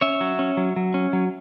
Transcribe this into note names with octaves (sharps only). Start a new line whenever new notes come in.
C#4 C#5 E5
F#3
C#4
F#3
F#3
C#4
F#3